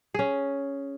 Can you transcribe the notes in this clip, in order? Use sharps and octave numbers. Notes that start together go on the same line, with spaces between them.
C#4 G#4